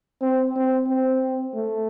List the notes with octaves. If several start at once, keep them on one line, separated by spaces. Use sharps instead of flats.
C4
C4
C4
A3